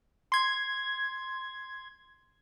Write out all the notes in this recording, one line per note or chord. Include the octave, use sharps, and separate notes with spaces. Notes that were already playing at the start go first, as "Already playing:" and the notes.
C6 G#6